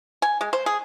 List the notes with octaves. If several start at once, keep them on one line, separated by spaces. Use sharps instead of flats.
G#5
G#3
C5
G#4